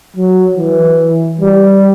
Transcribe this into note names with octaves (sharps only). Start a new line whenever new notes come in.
F#3
E3
G3